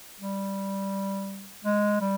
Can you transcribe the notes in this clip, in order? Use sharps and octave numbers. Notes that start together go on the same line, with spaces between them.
G3
G#3
G3